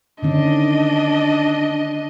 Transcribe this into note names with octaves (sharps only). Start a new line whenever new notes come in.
D3 D#3 C#4 D4 D#5